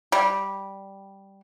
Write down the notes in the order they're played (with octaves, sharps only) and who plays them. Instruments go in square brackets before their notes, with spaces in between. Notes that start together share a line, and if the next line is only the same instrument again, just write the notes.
[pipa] G3